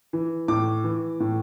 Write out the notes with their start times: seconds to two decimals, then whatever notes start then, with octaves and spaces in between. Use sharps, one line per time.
0.13 E3
0.48 A2 D6
0.84 E3
1.20 A2